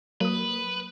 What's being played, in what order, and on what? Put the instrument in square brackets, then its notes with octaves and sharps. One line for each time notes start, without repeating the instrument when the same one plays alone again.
[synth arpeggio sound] F#3 D#6 [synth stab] A#3 [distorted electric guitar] B4